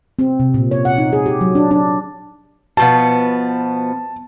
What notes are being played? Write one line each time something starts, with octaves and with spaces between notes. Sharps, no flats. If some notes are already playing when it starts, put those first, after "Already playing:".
C4
C3
A#2
C#5
F#5
D#4
G#4
G4
F#3
D4
D4
B2 F3 B3 A5